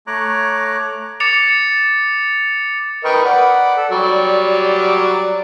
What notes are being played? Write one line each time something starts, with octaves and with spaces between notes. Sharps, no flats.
A3 C#5 A#5 D6 F#6
D6 A6 C#7 F7
A#4 B4 D#5 G5 C#6
D5 F#5 B5
A4
F#3 G3 D5